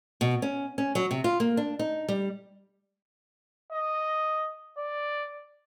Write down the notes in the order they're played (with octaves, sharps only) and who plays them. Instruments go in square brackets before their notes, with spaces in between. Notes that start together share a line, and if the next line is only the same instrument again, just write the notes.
[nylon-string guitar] B2
C#4
C#4
F#3
C3
F4
A#3
D4
D#4
G3
[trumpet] D#5
D5